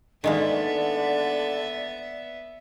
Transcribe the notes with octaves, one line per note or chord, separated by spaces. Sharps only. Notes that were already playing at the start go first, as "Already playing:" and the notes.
D3 D#3 G#3 A#3 B3 D5 E5